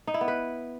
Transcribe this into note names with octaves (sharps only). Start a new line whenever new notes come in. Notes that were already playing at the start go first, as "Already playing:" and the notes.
D#4
E4
B3
B4